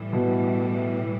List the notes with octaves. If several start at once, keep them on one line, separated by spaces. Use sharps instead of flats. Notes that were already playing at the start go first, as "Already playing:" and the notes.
Already playing: A2 E3 G3
B2